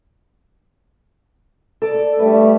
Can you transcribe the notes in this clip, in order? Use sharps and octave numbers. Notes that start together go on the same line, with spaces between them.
A4 D5
G2 G3 A3 B4